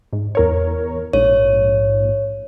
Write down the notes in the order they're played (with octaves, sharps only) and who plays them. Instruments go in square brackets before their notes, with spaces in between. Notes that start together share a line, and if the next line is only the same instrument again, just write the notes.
[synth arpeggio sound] G#2
E2 A#4 C#5
[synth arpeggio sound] A#1 G#2 [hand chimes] C#5